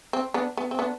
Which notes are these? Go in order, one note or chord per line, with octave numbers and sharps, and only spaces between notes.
C4
B3 D4
B3
C4
B3 D4